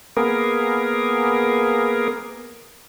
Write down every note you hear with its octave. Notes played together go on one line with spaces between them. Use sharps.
A#3 B3 G#4 A#4